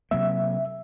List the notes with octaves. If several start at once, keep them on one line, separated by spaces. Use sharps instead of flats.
C3 F#3 A#3 E5